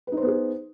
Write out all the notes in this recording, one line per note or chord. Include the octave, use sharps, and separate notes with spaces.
B3 D#4 G#4 B4 C5